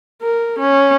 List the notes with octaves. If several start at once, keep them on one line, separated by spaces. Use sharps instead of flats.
A#4
C#4